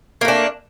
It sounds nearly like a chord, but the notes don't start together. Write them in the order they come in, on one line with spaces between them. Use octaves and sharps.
A#3 A3 D4